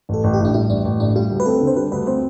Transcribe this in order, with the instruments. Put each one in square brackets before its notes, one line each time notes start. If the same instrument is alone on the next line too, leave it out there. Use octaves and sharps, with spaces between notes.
[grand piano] A1 [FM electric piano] A4
[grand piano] A1
[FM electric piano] G4
[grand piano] A2
[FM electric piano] D4
[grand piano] G3 [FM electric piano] E4
[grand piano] A1 [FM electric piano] D4
[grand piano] A1
[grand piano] A2 [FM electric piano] D4
[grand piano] G3 [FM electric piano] F4
[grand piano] D2
[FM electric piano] B4
[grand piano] C4 [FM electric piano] A4
[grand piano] D3
[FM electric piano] C5
[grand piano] G3 [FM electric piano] B4
[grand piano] D2 [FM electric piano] B4
[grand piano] C4 [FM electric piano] C5